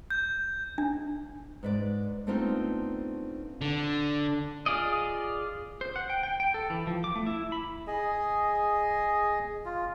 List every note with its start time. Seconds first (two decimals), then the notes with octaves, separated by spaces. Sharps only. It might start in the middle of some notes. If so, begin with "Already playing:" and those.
0.10 G6
0.78 D4
1.63 G#2 B4 D5
2.27 A3 B3 C4 D4 D#4 F4
3.61 D3
4.66 F4 G#4 D5 D#5
5.81 C5
5.96 F#5
6.10 G5
6.23 G5
6.40 G5
6.54 A4
6.70 E3
6.87 F3
7.04 D6
7.15 A3
7.26 E4
7.52 B5
7.87 G#4 D#5
9.65 F4